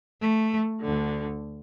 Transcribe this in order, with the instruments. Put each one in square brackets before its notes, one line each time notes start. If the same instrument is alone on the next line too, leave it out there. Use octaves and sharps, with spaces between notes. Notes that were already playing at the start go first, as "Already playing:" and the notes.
[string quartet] A3
D2 D3